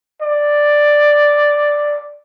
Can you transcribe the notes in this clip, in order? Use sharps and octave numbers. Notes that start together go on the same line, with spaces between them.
D5